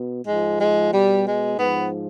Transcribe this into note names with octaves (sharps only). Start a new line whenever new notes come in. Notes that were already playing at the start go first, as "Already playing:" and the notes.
Already playing: B2
G#2 F3 G#3
G#3
B2 G3
G#3
G#2 F3 B3